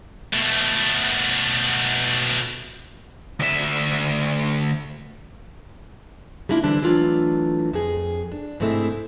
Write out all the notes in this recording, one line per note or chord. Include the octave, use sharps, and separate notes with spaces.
B2 A3
D2 E5
G3 A#3 D4 E4 F4
D3 E3 G3 D4 C5
E3 F#3 A3 D4 F4
F2 G#4
D4
G#2 C3 G#3 A3 C4 E4